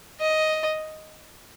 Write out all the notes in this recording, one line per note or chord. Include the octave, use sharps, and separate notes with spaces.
D#5